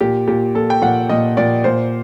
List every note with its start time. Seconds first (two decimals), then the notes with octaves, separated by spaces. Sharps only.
0.01 A#2 G4
0.28 A#2 G4
0.55 A#2 A4
0.70 G5
0.82 A#2 F#5
1.09 A#2 D#5
1.37 A#2 D5
1.64 A#2 C5